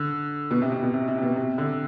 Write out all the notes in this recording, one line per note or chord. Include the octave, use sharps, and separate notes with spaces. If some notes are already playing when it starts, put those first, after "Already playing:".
Already playing: D3
B2
C3
C3
B2
C3
C3
C3
B2
C3
D3